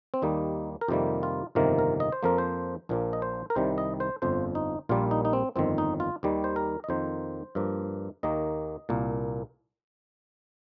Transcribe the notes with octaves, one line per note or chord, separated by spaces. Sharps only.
C4
D#2 D#3 G3 A#3 D#4
A#4
F2 C3 D#3 G3 A#3 G4
F4
G1 F2 C3 D#3 A#3 A#4
A#4
D#5
C5
F2 F3 A#3 A#4
C5
A#1 A#2 F3 A#3
D#5
C5
A#4
C2 C3 D#3 G3 C5
D#5
C5
G1 F2 F3 C5
D#4
A#1 A#2 G3 A#3 F4
D#4
D#4
C4
G1 F2 D#3 C4
D#4
F4
D#2 D#3 G3
C5
A#4
D#5
F2 D#3 A#3 C5
G2 F3 A#3
D#2 D#3 A#3 D#5
C2 A#2 A#3